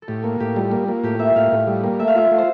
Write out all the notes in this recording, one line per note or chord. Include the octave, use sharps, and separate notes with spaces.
A4
A2 G4
A#3
A2 G4
G3 F4
A#3
A#3
A2 G4
A#3 E5
A2 F5
A2
G3
A#3
A3 E5
F5
F4 E5
A3
C5